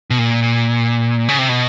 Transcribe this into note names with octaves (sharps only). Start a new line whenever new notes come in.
B2
A#2
C#3
C3
B2